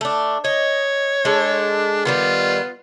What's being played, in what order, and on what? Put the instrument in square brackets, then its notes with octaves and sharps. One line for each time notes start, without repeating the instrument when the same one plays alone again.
[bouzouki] A3 D4
[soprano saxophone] C#5 [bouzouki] D#5
[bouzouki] G#3 A4 [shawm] D4
[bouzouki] D#3 F#3 G3 [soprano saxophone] B3 [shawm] F4